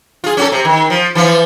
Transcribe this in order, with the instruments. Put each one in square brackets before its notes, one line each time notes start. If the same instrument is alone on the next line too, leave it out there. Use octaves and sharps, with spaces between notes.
[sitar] F4 G#4
C#4 F#4 A4
C3
D#3
F3
E3 F3 F4